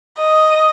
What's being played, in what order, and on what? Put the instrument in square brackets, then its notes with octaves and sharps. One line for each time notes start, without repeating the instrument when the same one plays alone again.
[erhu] D#5